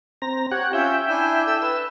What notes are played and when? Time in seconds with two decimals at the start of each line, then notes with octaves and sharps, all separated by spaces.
0.22 C4 A#5
0.51 G4 C#5 F#5
0.73 C#4 F4 C#5 E5 G5
1.09 D4 E4 G#5
1.47 A4 E6
1.62 B4 E6